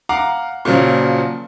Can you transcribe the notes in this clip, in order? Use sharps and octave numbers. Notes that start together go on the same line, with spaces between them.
F5 F#5 A#5 D6
A#2 C#3 F3 F#3